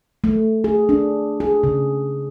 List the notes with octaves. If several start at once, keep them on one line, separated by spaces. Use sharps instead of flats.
A3
G#4
D4
G#4
C#3